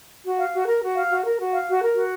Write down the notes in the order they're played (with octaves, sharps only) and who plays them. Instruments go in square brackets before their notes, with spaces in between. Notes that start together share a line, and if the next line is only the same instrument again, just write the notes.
[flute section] F#4
F5
F#4
A#4
F#4
F5
F#4
A#4
F#4
F5
F#4
A#4
F#4